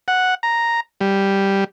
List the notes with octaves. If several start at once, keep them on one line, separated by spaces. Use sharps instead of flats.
F#5
A#5
G3